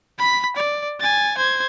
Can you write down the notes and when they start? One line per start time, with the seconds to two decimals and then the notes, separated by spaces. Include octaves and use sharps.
0.19 B5 B6
0.56 D5
1.00 G#5 A6
1.37 C5 G#6